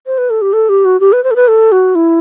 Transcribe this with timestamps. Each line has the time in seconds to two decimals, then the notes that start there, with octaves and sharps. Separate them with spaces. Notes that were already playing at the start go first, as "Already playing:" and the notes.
0.06 C5
0.18 B4
0.30 A4
0.42 G4
0.53 A4
0.69 G4
0.85 F#4
1.00 G4
1.13 B4
1.24 C5
1.31 A4
1.36 B4
1.48 A4
1.72 F#4
1.95 E4